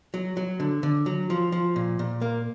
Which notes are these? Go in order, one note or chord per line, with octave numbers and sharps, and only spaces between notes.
F#3
F#3
D3
D3
F#3
F3
F3
A#2
A#2
A#3